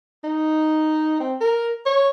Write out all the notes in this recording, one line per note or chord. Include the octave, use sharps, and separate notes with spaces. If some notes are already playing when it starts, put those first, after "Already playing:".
D#4
C4
A#4
C#5